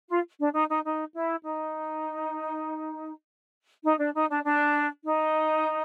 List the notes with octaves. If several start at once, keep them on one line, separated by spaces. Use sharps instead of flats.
F4
D4
D#4
D#4
D#4
E4
D#4
D#4
D4
D#4
D4
D4
D#4